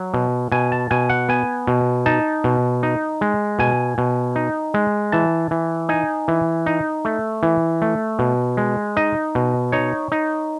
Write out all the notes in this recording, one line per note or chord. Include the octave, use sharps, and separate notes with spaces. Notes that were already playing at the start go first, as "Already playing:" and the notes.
Already playing: F#3
B2
B2 G#5
A5
B2 G#5
F#5
B3 G#5
B2
D#4 A5
B2
D#4
G#3
B2 G#5
B2
D#4
G#3
E3 A5
E3
D#4 G#5
E3
D#4
A3
E3
A3
B2
G#3
D#4 D#5
B2
D#4 C#5
D#4